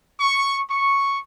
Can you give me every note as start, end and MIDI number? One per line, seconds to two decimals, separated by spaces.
0.20 0.61 85
0.70 1.19 85